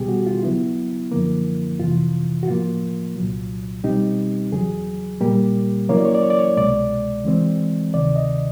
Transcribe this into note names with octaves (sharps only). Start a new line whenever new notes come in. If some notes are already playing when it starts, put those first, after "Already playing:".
Already playing: C#2 B2 G3 B3 G4 G#4
F#4
F4
C#3 F#3 B3 E4
F#2 D3 F3 A#3
F2 C3 E3 F4
F#4
A2 F3 A#3 F4
C2 A#2 F#3
B2 G3 C4 D#4 G4
E2 C#3 F#3 G#4
A#2 G3 A#3 G4
C#3 F#3 A#3 C#4 E4 C#5
D5
C#5
D5
C#5
D5
C#5
C2 B2 G#3 D5
C#3 E3 G#3 C4
D2 C3 D#3 D5
D#5